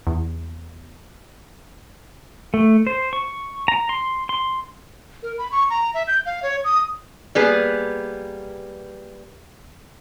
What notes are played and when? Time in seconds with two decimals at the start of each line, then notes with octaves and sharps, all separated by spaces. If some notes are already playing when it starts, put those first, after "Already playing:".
0.07 E2
2.54 A3
2.87 C5
3.13 C#6
3.68 A#5
3.89 C6
4.29 C6
5.23 A#4
5.38 B5
5.52 C#6
5.70 A#5
5.94 E5
6.07 G6
6.26 F5
6.43 C#5
6.64 D#6
7.35 G3 A#3 B3 G#4 B4